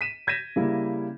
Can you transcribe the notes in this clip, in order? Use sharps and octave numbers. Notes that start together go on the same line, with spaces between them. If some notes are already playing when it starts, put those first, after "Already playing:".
B6 D#7 E7
G6 G#6 A#6 B6 D#7 E7
C#3 G3 A#3 E4